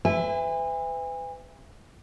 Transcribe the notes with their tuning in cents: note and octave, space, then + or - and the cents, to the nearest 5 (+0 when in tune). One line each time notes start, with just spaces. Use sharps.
B4 +35 E5 +0 G#5 -40